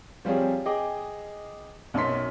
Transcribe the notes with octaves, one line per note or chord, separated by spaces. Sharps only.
F3 G3 C4 F4 G#4 C#5
G#4 D#5 G5 D6
B1 F#2 C#5 C6 B6